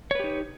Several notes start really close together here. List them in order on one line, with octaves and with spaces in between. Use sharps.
C#5 B4 G4 D#4